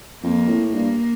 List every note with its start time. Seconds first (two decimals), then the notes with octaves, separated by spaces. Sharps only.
0.23 F2 A#3
0.49 A2
0.74 G2 A#3